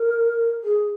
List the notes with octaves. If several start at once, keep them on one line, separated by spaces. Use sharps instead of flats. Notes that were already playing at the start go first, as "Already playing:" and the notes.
Already playing: A#4
G#4